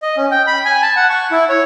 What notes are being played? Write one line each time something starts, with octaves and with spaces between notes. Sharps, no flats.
D#5
C#4
G5
B5
G#5
A5
F#5
C#6
E4
C#5